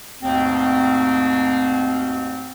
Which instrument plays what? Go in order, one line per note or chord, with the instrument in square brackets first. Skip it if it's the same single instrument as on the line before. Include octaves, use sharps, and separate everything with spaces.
[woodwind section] D#2 G#2 B2 A3 C4